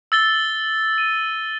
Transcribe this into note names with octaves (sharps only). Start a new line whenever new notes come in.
E6 A6 G7
D#7